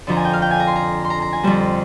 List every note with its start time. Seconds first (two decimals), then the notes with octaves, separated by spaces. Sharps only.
0.07 F2 D3 F3 A#5
0.17 G#5
0.25 G5
0.33 F5
0.42 G5
0.51 G#5
0.60 A#5
0.67 C6
0.76 A#5
1.04 C6
1.10 A#5
1.22 A#5
1.33 G#5
1.43 F2 D3 G3 C5